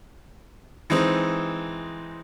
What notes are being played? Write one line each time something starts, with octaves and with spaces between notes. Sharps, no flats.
E3 G#3 C4 D#4